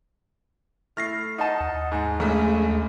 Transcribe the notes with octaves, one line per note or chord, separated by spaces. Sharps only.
A3 E4 F6 A#6 C7
D#4 D#5 F#5 A5
D#2
G#2 G#5
A#1 C#3 G#3 A3